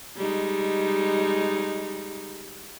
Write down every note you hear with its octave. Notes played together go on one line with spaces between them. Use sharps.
G3 G#3 D#4